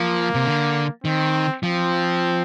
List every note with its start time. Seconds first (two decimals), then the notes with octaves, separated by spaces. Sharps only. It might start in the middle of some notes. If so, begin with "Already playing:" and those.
Already playing: F3 A#3
0.35 C3
0.45 D3
1.04 D#3 C4
1.63 F3 C4